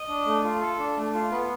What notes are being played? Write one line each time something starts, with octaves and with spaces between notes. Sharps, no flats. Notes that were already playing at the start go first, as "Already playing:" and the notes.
Already playing: D#5
D4
A3
F4
A4
D4
A3
F4
B3 B4